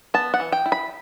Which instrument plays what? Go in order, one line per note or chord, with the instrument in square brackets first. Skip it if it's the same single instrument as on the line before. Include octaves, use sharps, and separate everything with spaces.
[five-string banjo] B3 A5
F#5
E3
G5
E4
B5